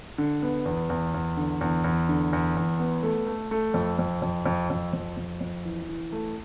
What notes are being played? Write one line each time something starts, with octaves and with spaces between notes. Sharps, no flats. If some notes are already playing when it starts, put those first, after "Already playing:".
D3
B3
E2
E2
E2
D3
E2
E2
D3
E2
E2
B3
A3
A3
A3
F2
F2
F2
F2
F2
F2
F2
F2
E3
E3
A3